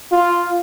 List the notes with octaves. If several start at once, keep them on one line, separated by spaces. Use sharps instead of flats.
F4